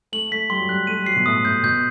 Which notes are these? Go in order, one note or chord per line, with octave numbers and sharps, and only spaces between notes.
A3 F#7
A3 B6
G3 C6
F#3
G3 F#6
A3 D#7
G3
F#3 C7
B2
A2 D#6
A2 G6
B2 G6